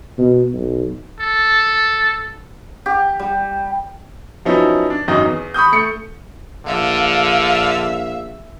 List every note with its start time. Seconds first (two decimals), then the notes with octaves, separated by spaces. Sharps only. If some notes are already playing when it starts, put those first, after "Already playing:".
0.18 B2
0.54 B1
1.20 A4
2.86 G4
3.19 G3
4.45 F3 F#3 B3 C#4 D#4 E4
4.90 D4
5.08 G#1 F#2 D#4 D#5
5.25 E2
5.54 B5 C#6 D#6 G6
5.72 A3 C#7
6.66 A#1 D3 E5 F5